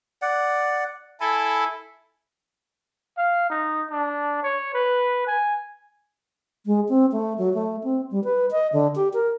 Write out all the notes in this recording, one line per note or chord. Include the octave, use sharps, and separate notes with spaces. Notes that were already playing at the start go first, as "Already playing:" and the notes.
D5 F#5
E4 A4 G#5 B5
F5
D#4
D4
C#5
B4
G#5
G#3
C4
A3
F#3
A3
C4
G3
B4
D#5
D3
G4
A#4